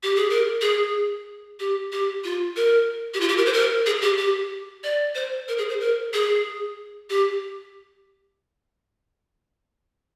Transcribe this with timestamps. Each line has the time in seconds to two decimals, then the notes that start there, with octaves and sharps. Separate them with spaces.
0.03 G4
0.16 G#4
0.30 A#4
0.61 G#4
1.60 G4
1.92 G4
2.24 F4
2.56 A#4
3.14 G4
3.21 F4
3.29 G4
3.38 A#4
3.46 C5
3.53 A#4
3.86 G#4
4.02 G4
4.18 G4
4.84 D5
5.15 C5
5.48 A#4
5.58 G#4
5.69 C5
5.80 A#4
6.13 G#4
7.10 G4